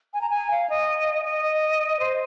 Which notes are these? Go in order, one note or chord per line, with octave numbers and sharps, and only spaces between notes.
G#5
A#5
G#5
F5
D#5
D#5
C5